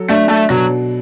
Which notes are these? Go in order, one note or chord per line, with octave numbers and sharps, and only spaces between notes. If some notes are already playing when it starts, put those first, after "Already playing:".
Already playing: F#3 A4
A3 D4
A3
B2 F#3